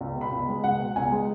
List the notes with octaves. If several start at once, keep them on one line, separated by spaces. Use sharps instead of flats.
C#2
B2
B5
C#2
G#3
C#2 F#5
B2
C#2 G#5
G#3